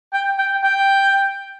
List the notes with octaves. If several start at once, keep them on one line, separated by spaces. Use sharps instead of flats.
G5
G5
G5